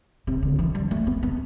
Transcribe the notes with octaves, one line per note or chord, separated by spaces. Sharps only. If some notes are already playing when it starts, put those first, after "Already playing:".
C3
D3
E3
G3
A3
B3
B3